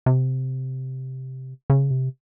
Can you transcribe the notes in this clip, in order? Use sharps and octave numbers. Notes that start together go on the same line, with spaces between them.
C3
C#3
C3